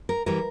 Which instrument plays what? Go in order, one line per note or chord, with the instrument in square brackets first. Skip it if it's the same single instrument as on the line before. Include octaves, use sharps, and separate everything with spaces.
[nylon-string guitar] A#4
E3 G3 A#4